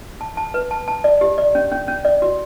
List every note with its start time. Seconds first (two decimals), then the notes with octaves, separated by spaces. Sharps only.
0.21 A5
0.37 A5
0.54 B4
0.71 A5
0.88 A5
1.04 D5
1.21 G4
1.38 D5
1.55 C#4
1.71 C#4
1.88 C#4
2.05 D5
2.22 F#4